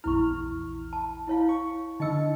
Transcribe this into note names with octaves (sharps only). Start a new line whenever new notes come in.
A#1 E2 E4 C#6 F6
A5
E4 C#5 F5
C#6
D3 D#4 D#5 E6 C#7